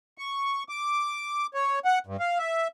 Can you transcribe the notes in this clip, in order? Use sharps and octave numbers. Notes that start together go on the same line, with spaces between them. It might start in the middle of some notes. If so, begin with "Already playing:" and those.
C#6
D6
C#5
F#5
G2
F5
E5